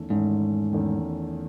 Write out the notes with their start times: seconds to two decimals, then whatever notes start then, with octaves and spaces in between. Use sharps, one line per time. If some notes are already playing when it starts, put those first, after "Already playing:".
Already playing: E2 D#3 A3 C#4
0.10 E2 G#2 D#3 A3 C#4
0.73 E2 D#3 A3 C#4